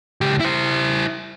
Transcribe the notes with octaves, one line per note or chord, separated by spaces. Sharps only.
C#2 G4
E4 C5